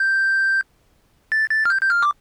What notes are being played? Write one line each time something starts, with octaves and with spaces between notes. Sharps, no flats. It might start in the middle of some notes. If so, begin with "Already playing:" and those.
Already playing: G6
A6
A6
F6
G6
G6
F6
D6